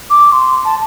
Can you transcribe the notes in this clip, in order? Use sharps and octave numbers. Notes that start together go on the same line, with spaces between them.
D6
C6
A5